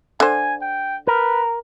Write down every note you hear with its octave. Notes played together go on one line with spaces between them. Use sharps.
D3 C5 G#5
G5
A#4 B4